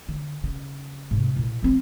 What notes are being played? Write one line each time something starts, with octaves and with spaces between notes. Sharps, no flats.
D3
C#3
G#2 C3
A#2 E4
F3 C4